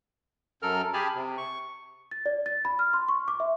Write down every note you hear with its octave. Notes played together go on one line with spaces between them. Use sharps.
F#2 A4 A#4 F6
G4 G#4 G#5 A5 B5 F6
C3
C#6
A6
D5
A6
B5
F6
C6
C#6
D6
E5